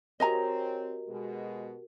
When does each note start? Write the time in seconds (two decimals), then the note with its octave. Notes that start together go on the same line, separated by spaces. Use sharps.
0.20 C4 F#4 G4 A#4 C#5 D#5 G#5 A#5
1.07 B2 G#3